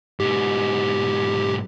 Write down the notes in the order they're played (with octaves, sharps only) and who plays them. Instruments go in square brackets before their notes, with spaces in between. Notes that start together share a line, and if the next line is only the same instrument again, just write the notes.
[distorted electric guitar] G#2 B2 [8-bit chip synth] G4